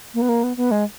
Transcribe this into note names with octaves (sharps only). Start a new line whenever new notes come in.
A#3
B3
A#3
B3
B3
G#3